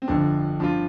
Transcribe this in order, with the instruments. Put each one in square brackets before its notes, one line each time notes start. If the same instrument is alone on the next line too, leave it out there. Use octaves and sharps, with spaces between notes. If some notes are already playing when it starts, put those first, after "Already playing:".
[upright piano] C4
[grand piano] G1 F2 D3 [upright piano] D4
[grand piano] G2 F3 C4 F4 [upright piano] D4